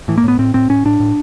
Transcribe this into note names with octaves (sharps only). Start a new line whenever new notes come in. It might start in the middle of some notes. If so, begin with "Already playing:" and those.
A2 E3
A#3
A2 B3
A2 C4
A2 C4
A2 C#4
A2 D4
A2